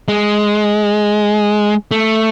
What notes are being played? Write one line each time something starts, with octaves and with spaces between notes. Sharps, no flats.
G#3
A3